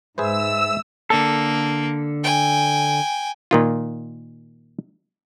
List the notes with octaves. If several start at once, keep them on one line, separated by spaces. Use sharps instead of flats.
G#2 G#4 B4 C5 E5 E6
D3 A#3 A4
G5 G#5
A#2 D#3 F4